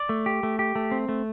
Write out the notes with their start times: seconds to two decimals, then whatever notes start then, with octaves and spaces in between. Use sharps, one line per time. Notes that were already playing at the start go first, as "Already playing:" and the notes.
Already playing: D5
0.09 A3
0.26 G4
0.43 A3
0.59 G4
0.75 A3
0.91 C4
1.09 A3